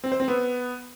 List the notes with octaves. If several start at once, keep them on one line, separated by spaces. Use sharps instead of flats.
C4
C5
C4
B3